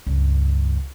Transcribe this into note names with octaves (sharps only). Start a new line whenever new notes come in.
C#2 G2